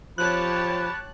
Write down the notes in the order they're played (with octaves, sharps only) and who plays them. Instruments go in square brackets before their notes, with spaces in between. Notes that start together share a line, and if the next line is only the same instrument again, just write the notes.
[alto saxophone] F3 [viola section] G4 C#5 A5 [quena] B5 [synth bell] F#6